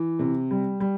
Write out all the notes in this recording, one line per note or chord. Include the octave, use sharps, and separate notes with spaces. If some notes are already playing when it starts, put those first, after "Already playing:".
Already playing: E3
C3
G3
G3